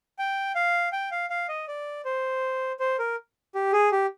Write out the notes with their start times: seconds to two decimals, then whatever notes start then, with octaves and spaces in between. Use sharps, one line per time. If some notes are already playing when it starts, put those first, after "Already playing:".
0.19 G5
0.55 F5
0.93 G5
1.11 F5
1.30 F5
1.49 D#5
1.68 D5
2.05 C5
2.80 C5
2.99 A#4
3.55 G4
3.73 G#4
3.92 G4